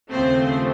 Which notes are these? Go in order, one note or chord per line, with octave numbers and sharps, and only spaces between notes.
D#2 C#3 F3 A3 C4 C5